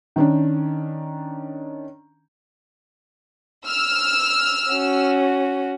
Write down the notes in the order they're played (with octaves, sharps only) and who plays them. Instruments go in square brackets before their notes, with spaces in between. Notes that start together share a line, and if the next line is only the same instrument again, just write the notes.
[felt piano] D#3 C#4 D4
[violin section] E6 F6
[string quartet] C#4 F#4